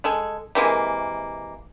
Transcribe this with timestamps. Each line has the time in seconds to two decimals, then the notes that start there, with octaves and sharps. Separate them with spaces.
0.04 G#3 A4 G#5
0.55 C3 E3 G#3 A#3